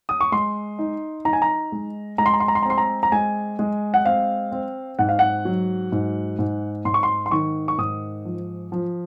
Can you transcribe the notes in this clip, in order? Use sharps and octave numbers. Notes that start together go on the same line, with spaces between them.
D#6
C#6
G#3 C6
D#4
D#4 A#5
G#5
A#5
G#3
G#3 A#5
C6
A#5
C6
A#5
C6
A#5
C4 C6
A#5
A#5
G#3 G#5
G#3
F#5
C4 F5
C4
G#2 F#5
F5
F#5
F#3
G#2
G#2
G#2 C6
C#6
C6
C6
D#3 C#6
C#6
G#2 D#6
F3
F3